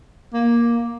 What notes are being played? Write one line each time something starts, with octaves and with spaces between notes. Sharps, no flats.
A#3